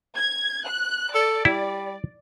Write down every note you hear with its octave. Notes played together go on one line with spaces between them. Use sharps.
G#6
F#6
A4 D5
G3 E4